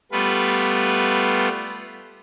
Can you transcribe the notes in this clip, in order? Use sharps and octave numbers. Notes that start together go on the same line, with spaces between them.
G3 A3 B3 F4 B4